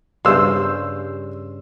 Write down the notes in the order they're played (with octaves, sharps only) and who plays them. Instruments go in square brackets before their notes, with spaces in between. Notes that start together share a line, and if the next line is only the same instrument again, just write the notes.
[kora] G2 C#3 C5 [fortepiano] C6 E6